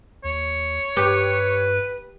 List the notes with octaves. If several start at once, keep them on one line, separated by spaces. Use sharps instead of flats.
D#2 C#5
G2 G4 B4